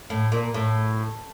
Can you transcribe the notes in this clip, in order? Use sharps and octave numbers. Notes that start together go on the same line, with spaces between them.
A2
A#2
A2